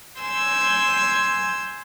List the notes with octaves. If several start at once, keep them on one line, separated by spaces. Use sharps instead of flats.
G#5 C6 E6 G6